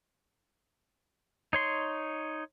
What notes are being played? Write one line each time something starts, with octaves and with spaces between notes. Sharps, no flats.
D#4 C#5 C6